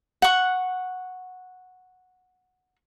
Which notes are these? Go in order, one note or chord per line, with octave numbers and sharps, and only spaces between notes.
F#5 C#6